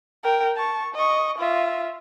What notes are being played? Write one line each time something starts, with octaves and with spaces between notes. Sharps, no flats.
A#4 G5
A5 C#6
D#5 C#6
F4 E5